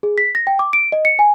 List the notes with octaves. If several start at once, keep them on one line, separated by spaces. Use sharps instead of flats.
G#4
B6
A#6
G5
D6
D7
D#5
C#7
G#5